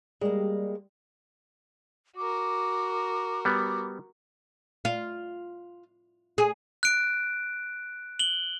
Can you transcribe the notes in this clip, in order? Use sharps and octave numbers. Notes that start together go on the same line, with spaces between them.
G3 G#3 A#3
F#4 A#4 D6
G3 B3 D6
F4
G#4
F#6 D7
F#7 G7